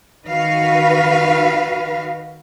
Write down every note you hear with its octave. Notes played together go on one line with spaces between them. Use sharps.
D#3 F#4 B4 F5